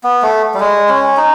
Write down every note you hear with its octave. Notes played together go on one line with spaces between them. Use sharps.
B3
A3
G3
G#3
C#4
D#4